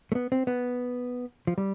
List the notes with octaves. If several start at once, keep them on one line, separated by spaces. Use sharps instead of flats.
A3
B3
C4
B3
F3
G3